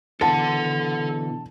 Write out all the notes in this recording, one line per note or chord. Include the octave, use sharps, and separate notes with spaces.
B2 D3 E3 A4 F#5 A5